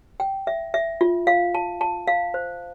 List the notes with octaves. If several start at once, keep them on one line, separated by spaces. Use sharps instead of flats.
G5
E5
E5
F4
F5
A5
A5
F5
C5